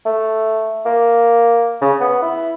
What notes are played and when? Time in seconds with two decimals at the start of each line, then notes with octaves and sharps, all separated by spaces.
0.06 A3
0.85 A#3
1.81 C#3
2.00 B3
2.22 E4